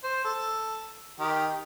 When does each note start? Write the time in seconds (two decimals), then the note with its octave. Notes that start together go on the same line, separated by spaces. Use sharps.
0.03 C5
0.24 A4
1.20 D#3 G4